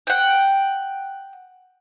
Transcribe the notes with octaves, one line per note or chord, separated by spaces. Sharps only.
F#5 G5